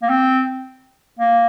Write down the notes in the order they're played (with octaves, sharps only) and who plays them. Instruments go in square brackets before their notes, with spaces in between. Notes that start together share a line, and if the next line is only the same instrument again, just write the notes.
[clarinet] A#3
C4
A#3